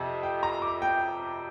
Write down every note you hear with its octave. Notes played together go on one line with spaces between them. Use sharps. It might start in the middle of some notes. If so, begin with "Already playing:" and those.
Already playing: F2 C3
G5
A#5
D6
G5